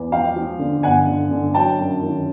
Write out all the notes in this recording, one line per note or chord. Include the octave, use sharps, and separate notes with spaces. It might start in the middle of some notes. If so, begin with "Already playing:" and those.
Already playing: E2
F3 F5 G5
F3
D3
G1 F#5 G#5
D3
D3
F#3 G5 A5
F#2
D#3